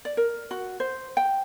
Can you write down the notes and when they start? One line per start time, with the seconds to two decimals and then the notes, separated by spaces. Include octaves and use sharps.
0.05 D5
0.17 A#4
0.51 F#4
0.80 C5
1.17 G5